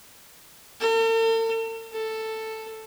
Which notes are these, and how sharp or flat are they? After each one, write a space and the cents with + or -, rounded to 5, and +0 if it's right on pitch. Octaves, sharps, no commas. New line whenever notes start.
A4 +45
A4 +5